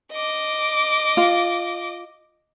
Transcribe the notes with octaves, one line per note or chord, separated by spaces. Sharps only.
D#5 D6
F4